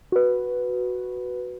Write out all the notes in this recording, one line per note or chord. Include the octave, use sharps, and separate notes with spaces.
F#4 B4